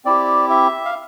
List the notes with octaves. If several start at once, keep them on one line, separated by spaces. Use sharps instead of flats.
C4 E4 G4 D5
E5
F5